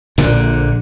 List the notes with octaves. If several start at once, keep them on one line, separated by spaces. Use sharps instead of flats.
A#1 A#2 D3